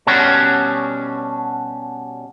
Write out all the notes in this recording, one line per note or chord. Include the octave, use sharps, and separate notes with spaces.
B2 G3 C#4 D4 F#4